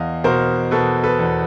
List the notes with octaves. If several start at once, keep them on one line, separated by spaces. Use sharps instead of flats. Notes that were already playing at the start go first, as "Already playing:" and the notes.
Already playing: E2 D#5 F5
B2 A#4 C5
B2 A4 B4
A4 B4
E2